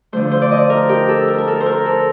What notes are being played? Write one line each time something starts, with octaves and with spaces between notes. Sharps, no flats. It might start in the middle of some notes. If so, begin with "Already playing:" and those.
D3 F3 A3 C5
C5
D5
D#5
A#4
G4
A4
A#4
A#4
A4
C5
A#4
A4